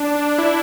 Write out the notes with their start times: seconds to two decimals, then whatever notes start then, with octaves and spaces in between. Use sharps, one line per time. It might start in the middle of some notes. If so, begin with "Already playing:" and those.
Already playing: D4
0.15 D4
0.38 E4